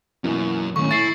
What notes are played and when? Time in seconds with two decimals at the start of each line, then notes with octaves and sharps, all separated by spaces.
0.24 F#2 B2 E3 A#3
0.76 D#2 A2 A3 C#4 C#6
0.91 E4 A6 C7